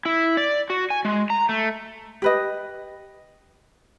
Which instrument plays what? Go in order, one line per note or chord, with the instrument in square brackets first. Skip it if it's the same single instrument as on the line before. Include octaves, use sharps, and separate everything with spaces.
[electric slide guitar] E4
D5
F#4
G#5
G#3
A#5
A3
[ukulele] G4 B4 D#5